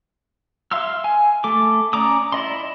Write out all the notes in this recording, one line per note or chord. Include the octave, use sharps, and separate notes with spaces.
E5 F5 C6 E6 F6
G#5
A3 A4 D6
C#4 D5 A#5 D6 D#6
E4 D5 D#5 C6